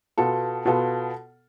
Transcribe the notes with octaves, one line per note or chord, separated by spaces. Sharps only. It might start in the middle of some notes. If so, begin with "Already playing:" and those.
B2 B3 F4 A4
B2 B3 F4 A4